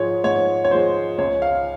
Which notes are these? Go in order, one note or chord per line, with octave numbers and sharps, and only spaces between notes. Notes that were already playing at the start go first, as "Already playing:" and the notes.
Already playing: G#2 F3 G#3 C#5
G#2 C#5
C#5
F3 G#3 C5
C#2 C#5
F5